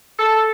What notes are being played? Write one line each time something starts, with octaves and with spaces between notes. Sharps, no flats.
A4